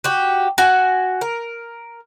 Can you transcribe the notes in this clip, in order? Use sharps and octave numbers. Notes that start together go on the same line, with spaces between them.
F#4 G4
F#4 G#5
A#4